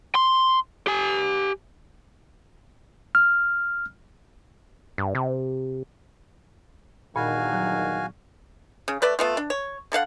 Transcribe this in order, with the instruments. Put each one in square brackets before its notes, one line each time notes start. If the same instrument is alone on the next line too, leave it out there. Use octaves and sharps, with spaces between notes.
[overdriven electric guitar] C6
G4 G#5
[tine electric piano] F6
[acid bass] G2
C3
[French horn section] E2 G2 D#3 [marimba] A#2 [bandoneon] F#4 F5 G#5
[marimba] F#3
[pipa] C#3
A3 B4 D5 E5
A3 B3 F4
D4
C#5
D3 A4 F5 F#5